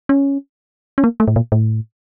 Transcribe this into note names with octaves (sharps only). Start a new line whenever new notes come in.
C#4
C#4
A#3
A3
A2
A#2
A2